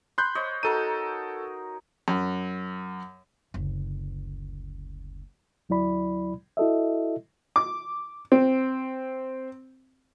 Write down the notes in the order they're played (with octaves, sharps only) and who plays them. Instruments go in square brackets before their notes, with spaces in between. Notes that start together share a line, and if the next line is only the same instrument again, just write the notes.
[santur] B5 [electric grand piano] C6 F#6 G6
[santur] C5 C#5 D#5
[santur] D#4 F#4 A#4 [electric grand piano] A4 D#7
[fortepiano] F#2
[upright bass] F#1 D2
[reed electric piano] D2 F#3 E4 D5 B5
E4 F#4 A4 D#5 E5
[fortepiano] D6
C4